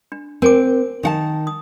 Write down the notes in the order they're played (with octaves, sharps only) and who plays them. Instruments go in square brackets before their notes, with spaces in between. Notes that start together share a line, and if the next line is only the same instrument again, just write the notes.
[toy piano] D4
[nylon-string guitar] C4 [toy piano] A#4 G#5 D6
[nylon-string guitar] D#3 F#5 A5
[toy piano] D#6